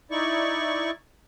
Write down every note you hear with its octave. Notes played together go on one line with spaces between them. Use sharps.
D#4 E4 D5 C#6